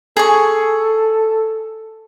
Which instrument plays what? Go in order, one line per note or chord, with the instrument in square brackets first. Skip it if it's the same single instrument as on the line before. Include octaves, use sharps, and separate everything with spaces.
[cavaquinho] G#4 G#5 C#6 [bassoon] A4